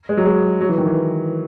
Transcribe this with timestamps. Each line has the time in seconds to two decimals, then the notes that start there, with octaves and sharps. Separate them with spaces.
0.09 G#3
0.17 F#3
0.26 G#3
0.61 F#3
0.69 E3
0.78 D#3
0.86 E3